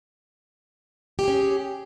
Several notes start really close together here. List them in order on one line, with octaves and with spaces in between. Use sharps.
G4 G#4 C#4